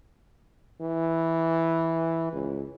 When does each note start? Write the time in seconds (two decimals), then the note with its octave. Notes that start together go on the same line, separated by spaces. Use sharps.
0.81 E3
2.33 C#2